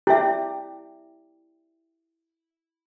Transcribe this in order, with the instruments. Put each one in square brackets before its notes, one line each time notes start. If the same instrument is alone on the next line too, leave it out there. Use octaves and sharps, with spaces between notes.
[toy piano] E4 E5 [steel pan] G4